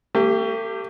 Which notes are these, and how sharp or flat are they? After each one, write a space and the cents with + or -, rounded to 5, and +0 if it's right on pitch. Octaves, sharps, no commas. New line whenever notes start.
A3 +45 G4 +0